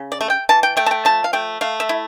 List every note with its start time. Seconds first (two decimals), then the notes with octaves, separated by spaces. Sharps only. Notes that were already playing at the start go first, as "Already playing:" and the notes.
Already playing: C#3
0.12 D5
0.21 A3
0.30 G5
0.49 E3 A5
0.63 G5
0.77 A3 G5
0.86 A5
0.91 G5
1.05 F3 A5
1.24 F5
1.33 A3 G5
1.61 A3 F5
1.80 E5
1.89 E4